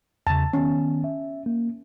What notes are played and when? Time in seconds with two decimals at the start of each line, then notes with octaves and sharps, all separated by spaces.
0.27 E2 C#3 A5
0.53 D#3 B3 C#4
1.04 E5
1.46 A#3